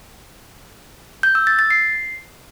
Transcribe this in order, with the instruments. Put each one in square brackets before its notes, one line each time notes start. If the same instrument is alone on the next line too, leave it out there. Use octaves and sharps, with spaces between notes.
[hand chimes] G6
E6
A6
A6
C7